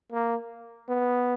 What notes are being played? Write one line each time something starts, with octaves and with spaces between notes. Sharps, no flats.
A#3
B3